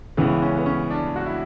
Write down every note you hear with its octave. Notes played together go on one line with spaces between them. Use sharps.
C#2 C#3 E3 B3
C#4
B3
C#4
D4
F#4
E4